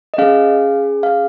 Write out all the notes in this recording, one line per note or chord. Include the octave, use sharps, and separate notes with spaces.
D#5
C#4 G#4 F5
F5